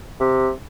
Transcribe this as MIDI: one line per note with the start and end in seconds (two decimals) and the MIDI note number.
0.20 0.49 48